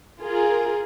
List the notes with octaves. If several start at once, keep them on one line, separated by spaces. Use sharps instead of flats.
F4 G#4 A#4